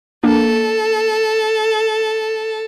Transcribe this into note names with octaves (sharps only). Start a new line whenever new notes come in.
A#3 D4 A4